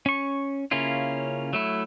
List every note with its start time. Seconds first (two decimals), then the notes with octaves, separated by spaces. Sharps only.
0.06 C#4 C#6
0.71 C#3 A#3 C#4 E4 F4
1.53 F#3 A3 E4